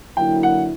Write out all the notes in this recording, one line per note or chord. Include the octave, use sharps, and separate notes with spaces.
D3 F#3 A#3 E4 G5
F#5